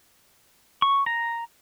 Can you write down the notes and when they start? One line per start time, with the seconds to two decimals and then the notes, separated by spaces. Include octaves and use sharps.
0.82 C#6
1.06 A#5